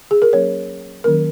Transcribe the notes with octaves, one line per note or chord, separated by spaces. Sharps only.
G#4
A#4
F#3 A#3 C#4 C#5
D#3 F#3 A#3 C#4 A#4